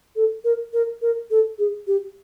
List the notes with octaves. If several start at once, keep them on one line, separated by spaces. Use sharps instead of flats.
A4
A#4
A#4
A#4
A4
G#4
G4